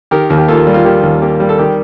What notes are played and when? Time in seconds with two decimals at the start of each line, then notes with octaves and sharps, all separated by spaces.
0.11 D#3 G4 A#4
0.30 D#2
0.38 G4
0.48 A#3 F4 A4
0.67 G3
0.74 F4
0.85 D#3 G4
1.03 D#2
1.22 A#3 G4
1.40 G3
1.49 A4
1.59 D#3 G4